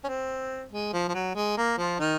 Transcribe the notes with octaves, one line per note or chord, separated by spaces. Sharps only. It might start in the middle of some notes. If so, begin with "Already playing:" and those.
C#4
C4
G#3
F3
F3
F#3
G#3
A#3
F3 F4
D#3 D#4